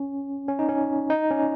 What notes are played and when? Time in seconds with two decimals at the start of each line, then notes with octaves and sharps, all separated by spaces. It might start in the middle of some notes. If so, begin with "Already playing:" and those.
Already playing: C#4
0.48 C#4
0.59 D#4
0.69 C#4
1.10 D#4
1.31 C#4